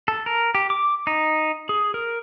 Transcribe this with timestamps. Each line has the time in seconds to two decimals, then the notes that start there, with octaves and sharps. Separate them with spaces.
0.08 A4
0.26 A#4
0.55 G4
0.70 D6
1.07 D#4
1.69 G#4
1.94 A#4